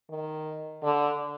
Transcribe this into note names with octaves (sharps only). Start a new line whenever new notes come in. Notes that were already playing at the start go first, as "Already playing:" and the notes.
D#3
D3